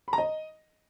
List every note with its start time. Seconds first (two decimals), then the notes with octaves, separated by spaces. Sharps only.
0.08 B5
0.13 A#5
0.18 D#5